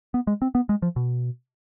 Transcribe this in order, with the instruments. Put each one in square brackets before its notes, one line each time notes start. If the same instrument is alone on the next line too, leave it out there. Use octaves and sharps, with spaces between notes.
[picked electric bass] B3
G#3
C4
B3
G#3
F3
B2